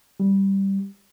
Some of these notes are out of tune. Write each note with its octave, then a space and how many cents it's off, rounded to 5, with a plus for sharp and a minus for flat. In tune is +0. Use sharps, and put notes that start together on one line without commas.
G3 -5